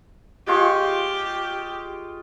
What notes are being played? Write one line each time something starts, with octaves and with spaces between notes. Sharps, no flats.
G#3 F4 G4 C#6